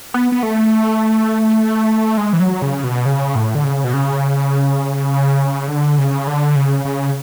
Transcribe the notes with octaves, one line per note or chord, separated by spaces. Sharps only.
B3
B3
A3
G#3
E3
F#3
C#3
B2
C#3
A2
D3
C#3
B2
C#3
D3
C#3
D3
C#3
C#3